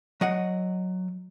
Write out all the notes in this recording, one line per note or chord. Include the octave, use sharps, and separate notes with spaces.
F#3 D#5 F#5